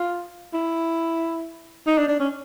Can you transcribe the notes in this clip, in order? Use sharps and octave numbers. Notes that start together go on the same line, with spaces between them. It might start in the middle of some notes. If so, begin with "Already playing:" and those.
Already playing: F4
E4
D#4
D4
D4
C#4